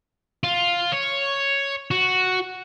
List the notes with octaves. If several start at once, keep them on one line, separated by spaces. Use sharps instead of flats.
F4
C#5
F#4